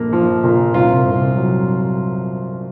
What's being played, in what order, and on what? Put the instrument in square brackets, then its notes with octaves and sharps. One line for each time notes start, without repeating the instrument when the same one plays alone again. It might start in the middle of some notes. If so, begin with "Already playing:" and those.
Already playing: [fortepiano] A#1 A#3
F3
A#2
C2 F4
C2
F#3